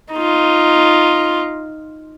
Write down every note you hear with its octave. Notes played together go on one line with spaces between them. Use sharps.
D#4 F4